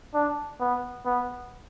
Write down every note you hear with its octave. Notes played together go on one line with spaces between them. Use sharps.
D4
B3
B3